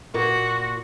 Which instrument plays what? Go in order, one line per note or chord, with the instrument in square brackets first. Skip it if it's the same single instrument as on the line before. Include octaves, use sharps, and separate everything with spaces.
[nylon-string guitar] A#2 A#3 [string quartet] F#4